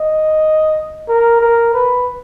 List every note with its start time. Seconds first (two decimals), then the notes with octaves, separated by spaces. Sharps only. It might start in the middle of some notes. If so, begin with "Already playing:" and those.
Already playing: D#5
1.08 A#4
1.41 A#4
1.73 B4